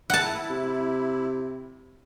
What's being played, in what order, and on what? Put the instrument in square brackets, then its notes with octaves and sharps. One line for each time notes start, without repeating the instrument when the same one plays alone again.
[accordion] E4 [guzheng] F#5 A5
[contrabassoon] C3